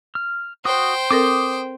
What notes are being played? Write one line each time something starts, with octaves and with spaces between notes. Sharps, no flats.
F6
F#4 C5 G5 D#6
C4 A4 A#4 D6 D#6